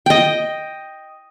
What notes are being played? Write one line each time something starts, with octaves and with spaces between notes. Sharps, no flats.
D#5 G5